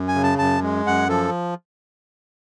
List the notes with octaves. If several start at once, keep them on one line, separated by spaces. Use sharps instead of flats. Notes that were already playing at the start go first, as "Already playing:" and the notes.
Already playing: F#2
G#5
C#3
A5
F#2 A5
G#3
F#2 F#5
F3 A4